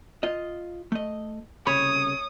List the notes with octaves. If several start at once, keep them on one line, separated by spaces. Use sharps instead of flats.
F4 D#5
A3 D#5
C2 C#3 C#5 B5 D#6